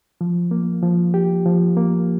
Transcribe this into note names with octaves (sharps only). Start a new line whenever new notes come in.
F3
A#3
F3
G4
F3
A#3